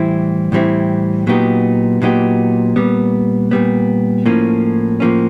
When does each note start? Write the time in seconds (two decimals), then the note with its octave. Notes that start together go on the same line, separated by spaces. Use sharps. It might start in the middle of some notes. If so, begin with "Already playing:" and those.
Already playing: A2 E3 G3 C4 E4
0.52 A2 E3 G3 C4 E4
1.27 A#2 F#3 B3 D#4 G4
2.02 A#2 F#3 B3 D#4 G4
2.76 A#2 G3 B3
3.51 A#2 G3 B3
4.26 A2 F3 A#3 C#4
5.00 A2 F3 A#3 C#4